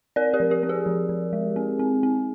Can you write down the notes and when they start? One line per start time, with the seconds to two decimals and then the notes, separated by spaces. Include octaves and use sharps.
0.16 C4 A#4 D5
0.34 G4 A#4
0.40 F3
0.51 G4
0.63 C4
0.69 G#4
0.86 F3
1.09 F3
1.33 G#3
1.56 C4
1.79 C4
2.03 C4